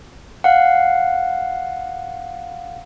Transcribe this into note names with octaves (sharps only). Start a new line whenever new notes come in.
F5 F#5